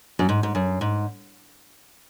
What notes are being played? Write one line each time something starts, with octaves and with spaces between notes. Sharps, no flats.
F#2
G#2
G#2
F#2
G#2